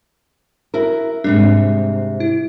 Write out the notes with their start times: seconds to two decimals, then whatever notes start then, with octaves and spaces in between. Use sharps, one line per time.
0.74 E4 F#4 A#4
1.24 G#2 C3 G3 D4
2.20 E4